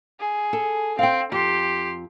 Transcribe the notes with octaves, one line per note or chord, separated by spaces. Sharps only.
G#4
A4
C4 F5 G5
F2 G4 C6